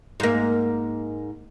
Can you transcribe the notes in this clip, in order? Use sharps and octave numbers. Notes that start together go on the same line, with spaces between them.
G#2 A#3